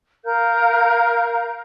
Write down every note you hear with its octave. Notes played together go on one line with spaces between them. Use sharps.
A#4 F5 G6